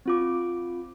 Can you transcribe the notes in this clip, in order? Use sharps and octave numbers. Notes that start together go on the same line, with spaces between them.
C4 F4 D6